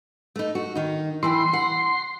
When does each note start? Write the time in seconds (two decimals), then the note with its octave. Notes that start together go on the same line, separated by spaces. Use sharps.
0.36 A3 D#4
0.55 F#4
0.75 D#3 D#4
1.23 E3 E4 G5 C6
1.53 F#5